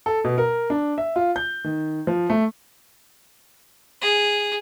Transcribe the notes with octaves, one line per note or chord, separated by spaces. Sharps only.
A4
B2
A#4
D4
E5
F4
G6
D#3
F3
A3
G#4